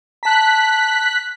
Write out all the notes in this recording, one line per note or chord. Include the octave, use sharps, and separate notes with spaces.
A5 A#5 F#6 B6